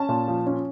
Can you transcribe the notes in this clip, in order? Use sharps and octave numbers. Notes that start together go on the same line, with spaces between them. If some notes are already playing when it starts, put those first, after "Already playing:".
Already playing: C#4 A5
A#2
F3
C#4